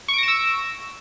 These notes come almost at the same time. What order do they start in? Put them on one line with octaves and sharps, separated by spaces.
C#6 D7 A#6 E7 E6